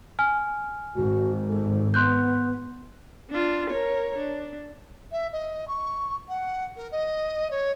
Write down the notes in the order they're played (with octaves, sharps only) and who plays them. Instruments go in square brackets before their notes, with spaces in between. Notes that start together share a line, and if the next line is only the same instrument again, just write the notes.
[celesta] G#5 F6
[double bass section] G#1 G#2 [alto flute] F#4
[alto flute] A4
[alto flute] B3 [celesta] C6 F#6 G6
[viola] D4 F4
A#4 C#5
D4
[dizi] E5
D#5
C#6
F#5
A#4
D#5
C#5